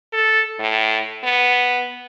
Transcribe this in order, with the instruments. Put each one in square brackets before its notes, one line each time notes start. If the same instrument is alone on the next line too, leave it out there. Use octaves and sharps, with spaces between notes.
[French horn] A4
A2
B3